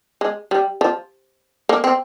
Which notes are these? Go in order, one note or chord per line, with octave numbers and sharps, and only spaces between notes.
G#3
G3
F3
A#3
C4